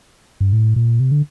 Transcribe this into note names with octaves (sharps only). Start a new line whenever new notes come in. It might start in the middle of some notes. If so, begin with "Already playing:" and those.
G2
A2
A#2
C3
D3